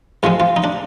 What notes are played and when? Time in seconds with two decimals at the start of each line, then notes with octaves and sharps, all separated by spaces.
0.23 G#2 F3 G#3 F4
0.40 F4
0.56 D#4
0.64 D4